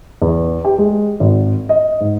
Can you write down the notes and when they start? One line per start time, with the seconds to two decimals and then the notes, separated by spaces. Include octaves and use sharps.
0.22 E2
0.64 G4
0.78 G#3
1.20 G#1
1.69 D#5
2.01 G#2